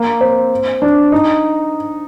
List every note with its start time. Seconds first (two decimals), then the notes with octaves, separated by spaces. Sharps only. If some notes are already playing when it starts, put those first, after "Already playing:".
Already playing: A#3
0.21 C4
0.82 D4
1.12 D#4